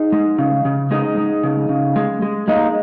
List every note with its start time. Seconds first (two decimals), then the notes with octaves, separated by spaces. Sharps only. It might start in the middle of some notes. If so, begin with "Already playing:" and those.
Already playing: D#4 G#4
0.12 G#3
0.39 C#3
0.65 C#3
0.91 G#3 D#4 G#4
1.17 G#3
1.43 C#3
1.69 C#3
1.96 G#3
2.22 G#3
2.48 G#3 A#3 D#4